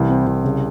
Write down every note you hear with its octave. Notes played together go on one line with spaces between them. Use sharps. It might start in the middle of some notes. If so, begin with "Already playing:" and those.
Already playing: C2 E3
C4
C2
C#3